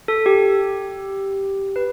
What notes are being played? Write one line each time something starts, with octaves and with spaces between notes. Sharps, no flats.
A4
G4
B4